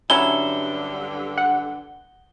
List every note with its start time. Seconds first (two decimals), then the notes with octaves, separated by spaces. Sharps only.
0.10 G2 D3 F#3 C#4 E4 G7
1.38 F#5